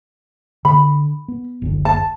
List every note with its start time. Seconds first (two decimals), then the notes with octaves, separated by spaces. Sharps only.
0.65 D3 B5
1.28 B3
1.62 F#1 D2 D3
1.85 A5